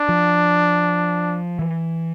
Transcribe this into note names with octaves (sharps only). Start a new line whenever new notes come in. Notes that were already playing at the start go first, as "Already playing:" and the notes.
Already playing: D4
F3
E3